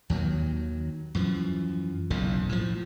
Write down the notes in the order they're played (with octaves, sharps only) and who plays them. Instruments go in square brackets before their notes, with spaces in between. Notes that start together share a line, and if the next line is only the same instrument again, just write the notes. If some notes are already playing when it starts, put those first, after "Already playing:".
[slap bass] D#2 D#3 F#3
F#2 E3 F3
F#1 B1 E2 C#3
A2 F3